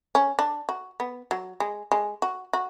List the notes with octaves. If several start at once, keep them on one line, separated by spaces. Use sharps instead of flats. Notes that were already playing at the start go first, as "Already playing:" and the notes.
C#4
D4
F#4
B3
F#3
G#3
G#3
F#4
F#4